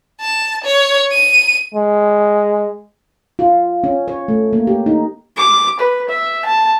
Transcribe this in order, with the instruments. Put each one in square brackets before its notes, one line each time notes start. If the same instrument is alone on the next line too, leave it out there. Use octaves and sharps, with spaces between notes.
[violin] A5
C#5
D#7
[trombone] G#3
[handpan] F4
C#4
C#5
A3
A#3
G4
D#4
[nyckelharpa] D6
B4
E5
A5